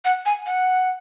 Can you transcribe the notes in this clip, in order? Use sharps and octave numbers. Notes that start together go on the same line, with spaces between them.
F#5
G#5
F#5